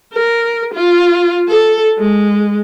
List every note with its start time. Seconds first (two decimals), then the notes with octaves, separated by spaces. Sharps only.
0.13 A#4
0.74 F4
1.48 A4
1.98 G#3